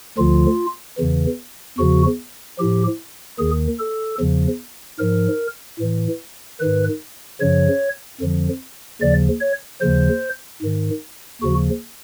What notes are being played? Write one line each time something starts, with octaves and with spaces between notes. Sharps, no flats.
D2 D3 F3 F4
E2 C#3 E3
E2 C#3 F3 F#4
A2 F3 G4
D#2 D#3 G#4
A4
E2 C#3 F3
G#2 F3 A#4
A2 E3
G#2 D#3 B4
F#2 C#3 F3 C#5
F2 D3 F3
D#2 C#3 F3 D5
C#5
D#2 C#3 F3 C5
G#2 D#3
D#2 C#3 F3 F#4